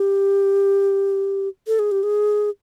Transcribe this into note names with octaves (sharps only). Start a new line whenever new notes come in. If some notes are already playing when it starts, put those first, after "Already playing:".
Already playing: G4
A4
G#4
G4
G#4